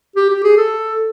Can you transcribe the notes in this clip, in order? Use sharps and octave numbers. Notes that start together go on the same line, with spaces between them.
G4
G4
G#4
A4